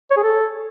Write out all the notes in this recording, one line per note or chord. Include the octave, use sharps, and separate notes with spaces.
C#5
G#4
A4